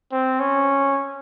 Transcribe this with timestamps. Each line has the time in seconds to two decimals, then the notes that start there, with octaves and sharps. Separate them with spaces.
0.12 C4
0.40 C#4